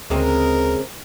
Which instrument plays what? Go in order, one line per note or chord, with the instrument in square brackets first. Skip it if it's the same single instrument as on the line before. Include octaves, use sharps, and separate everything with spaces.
[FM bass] D2 [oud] C#3 G#3 C4 [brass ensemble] A#4